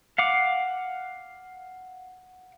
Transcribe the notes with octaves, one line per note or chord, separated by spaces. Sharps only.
F5 F#5 D6